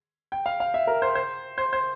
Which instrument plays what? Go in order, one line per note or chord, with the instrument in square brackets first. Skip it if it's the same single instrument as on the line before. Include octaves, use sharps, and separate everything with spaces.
[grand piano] G5
F5
F5
E5
A#4
C5
C5
C5
C5